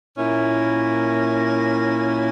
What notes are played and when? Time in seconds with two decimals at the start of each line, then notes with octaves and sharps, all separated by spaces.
0.17 A#2 A#3 C#4 E4